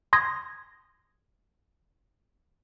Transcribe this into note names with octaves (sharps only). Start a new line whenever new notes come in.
C6 D#6 G#6 A#6